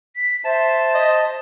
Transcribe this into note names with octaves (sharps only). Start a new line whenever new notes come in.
B6
C5 E5 A5
D#5